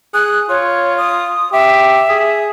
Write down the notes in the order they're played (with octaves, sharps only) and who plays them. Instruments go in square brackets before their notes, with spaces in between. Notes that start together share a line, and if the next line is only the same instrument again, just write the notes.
[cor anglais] G#4 [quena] F#6
[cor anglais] F4 [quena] C#5
[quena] D#6
[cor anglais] G4 [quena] E5
[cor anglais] G#4